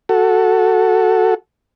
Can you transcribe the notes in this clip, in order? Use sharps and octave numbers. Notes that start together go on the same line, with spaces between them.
F#4 A4